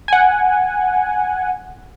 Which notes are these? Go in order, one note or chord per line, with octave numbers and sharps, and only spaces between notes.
F#5 G#5